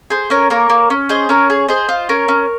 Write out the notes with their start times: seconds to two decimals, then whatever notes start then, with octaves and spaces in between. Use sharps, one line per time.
0.10 G#4 C5
0.30 C#4 A#4 C#5
0.50 A#3 A#4 C#5
0.70 A#3
0.90 C#4
1.09 G#4 C5 D#5
1.29 C#4 A#4 C#5
1.50 G#4
1.68 G#4 C5 D#5
1.89 F4
2.09 C#4 A#4 C#5
2.28 C#4